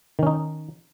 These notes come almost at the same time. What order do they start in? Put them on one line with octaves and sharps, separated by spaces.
D#3 C#4 D#4